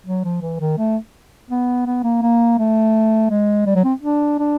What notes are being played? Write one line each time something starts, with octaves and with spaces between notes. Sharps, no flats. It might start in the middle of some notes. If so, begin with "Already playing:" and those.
F#3
F3
E3
D#3
A3
B3
B3
A#3
A#3
A3
G#3
G3
F#3
C4
D4
D4